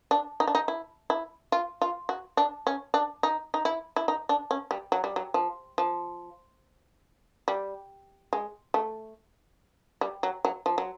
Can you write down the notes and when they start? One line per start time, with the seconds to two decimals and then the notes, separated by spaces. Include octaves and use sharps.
0.11 D4
0.40 D#4
0.48 D4
0.55 D#4
0.68 E4
1.10 E4
1.52 F4
1.82 F4
2.09 F#4
2.37 D4
2.67 C#4
2.94 D4
3.23 D#4
3.54 D#4
3.65 E4
3.96 E4
4.08 D#4
4.29 D4
4.51 C#4
4.71 G3
4.92 F#3
5.04 G3
5.16 F#3
5.34 F3
5.78 F3
7.48 G3
8.33 G#3
8.74 A3
10.01 G3
10.23 F#3
10.45 F#3
10.66 F3
10.78 F#3